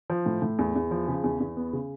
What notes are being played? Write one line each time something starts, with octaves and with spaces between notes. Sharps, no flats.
F3
A2
A2
E2
E2
F3
C#3
E2
E2
B3
C#3